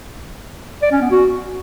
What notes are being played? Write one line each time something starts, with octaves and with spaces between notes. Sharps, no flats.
D5
C#4
B3
F#4